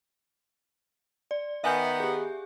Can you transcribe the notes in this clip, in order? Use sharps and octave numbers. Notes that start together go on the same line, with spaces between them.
D5
D#3 B3 E5 G#5 G6
G4 G#4